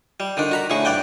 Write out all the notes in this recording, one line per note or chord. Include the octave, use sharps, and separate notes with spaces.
G3
D3 D#3 D4
F#4 A#5 B5
A2 D3 G#4 C#6
G2 D5 F#5 G5